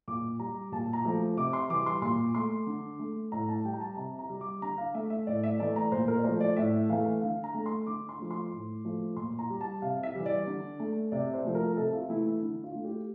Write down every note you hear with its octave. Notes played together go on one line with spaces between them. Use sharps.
A#2 D6
G3 A#5
A#2 A5
A#5
F3 A3
C3 D6
C6
E3 G3 D6
C6
A#2 C6
A3 C6
D3
A3
A2 A#5
A5
G3 G5
A#5
A5
C3 A#5
A#5
G3
D6
D3 A#5
F5
A3 E5
E5
A2 D5
E5
E3 A3 D5
A#5
A#2 C5
A#4
D5
F3 A3 C5
D5
A2 E5
E3 A3 F5
D3 F5
A#5
A3
C6
D3 D6
C6
F3 A3
C6
A2
F3 A3
A#2 C6
A#5
G3
A5
C3 F5
E5
E3 G3
D5
D3
A3
C3 D5
C5
F3 A3
A#4
C3 A4
F4
E3 A3 E4
E4
D3
F4
A3
G4